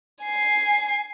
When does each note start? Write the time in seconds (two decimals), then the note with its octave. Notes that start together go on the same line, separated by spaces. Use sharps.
0.23 G#5 C7